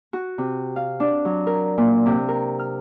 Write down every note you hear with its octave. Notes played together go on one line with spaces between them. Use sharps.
F#4
C3
F5
D4
F#3
A#4
A#2
C3
A#4
F6